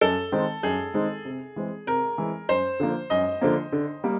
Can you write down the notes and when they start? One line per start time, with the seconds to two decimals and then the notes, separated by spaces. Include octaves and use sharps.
0.01 F#2 A4
0.32 D#3 G#3 C4 D#4
0.63 F#2 G#4
0.94 D#3 G#3 C4 D#4
1.25 C3
1.56 E3 G#3 C4
1.87 C3 A#4
2.18 E3 G#3 C4
2.49 F#2 C5
2.80 D3 F3 A#3
3.10 F#2 D#5
3.41 D3 F3 A#3
3.72 D3
4.04 G3 A#3